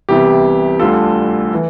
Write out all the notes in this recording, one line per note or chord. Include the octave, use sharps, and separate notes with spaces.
C2 C3 E3 B3 E4 G4
D2 D3 G3 D4 F4 A4
E3